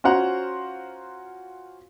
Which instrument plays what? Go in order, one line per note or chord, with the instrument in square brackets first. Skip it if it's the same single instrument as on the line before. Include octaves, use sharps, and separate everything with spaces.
[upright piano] C#4 F4 F#4 C5 F#5 A#5